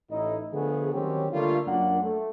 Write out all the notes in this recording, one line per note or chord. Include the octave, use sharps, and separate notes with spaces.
A1 A2 D#4 E4 D#5
D3 F3 A3 B3 G#4
D#3 F#3 G3 C4 C#4 G4
D3 G3 A3 A#3 F4
F#2 A#3 D4 F4 A#4 F#5
A3